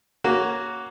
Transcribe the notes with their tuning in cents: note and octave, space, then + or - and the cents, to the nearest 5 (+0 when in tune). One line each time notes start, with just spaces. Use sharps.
A#3 +0 C#4 +0 F#4 +0